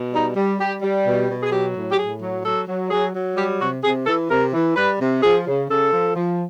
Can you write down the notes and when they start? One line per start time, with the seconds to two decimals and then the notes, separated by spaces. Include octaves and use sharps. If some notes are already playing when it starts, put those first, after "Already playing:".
Already playing: B2
0.11 G3 D#4
0.35 G3
0.58 G3 G4
0.82 G3
1.05 B2
1.28 B2
1.43 G#4
1.50 F#3 G4
1.74 A2
1.91 G4
1.97 A2 G#4
2.20 F#3
2.43 F#3 A4
2.67 F#3
2.90 F#3 G#4
3.13 F#3
3.36 G3 G4
3.59 C3 F#4
3.83 C3 G#4
4.06 E3 A4
4.29 C3 A#4
4.52 E3
4.75 G3 B4
4.99 C3
5.21 F3 G#4
5.46 C#3
5.68 C#3 A4
5.92 F3
6.14 F3